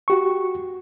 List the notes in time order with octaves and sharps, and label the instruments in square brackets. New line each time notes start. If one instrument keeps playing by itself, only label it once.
[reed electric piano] F#4 G4 C#6